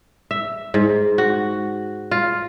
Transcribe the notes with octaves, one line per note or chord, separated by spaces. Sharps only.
E5
G#2
F#4
F4